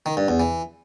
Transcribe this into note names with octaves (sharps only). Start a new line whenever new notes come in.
D#3
G2
E2
E3